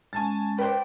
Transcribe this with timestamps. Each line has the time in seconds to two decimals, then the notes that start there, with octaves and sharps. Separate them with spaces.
0.13 G#3 C#4 G#5 A5 A6
0.59 B4 C5 D5 G5 A#5 D6